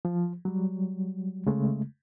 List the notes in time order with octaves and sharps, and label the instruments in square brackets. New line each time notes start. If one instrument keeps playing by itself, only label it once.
[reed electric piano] F3
F#3 G3
C#3 G#3 A3